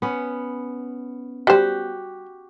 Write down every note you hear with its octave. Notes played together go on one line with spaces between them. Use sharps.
B3 C#4
G3 F#4 G4 C5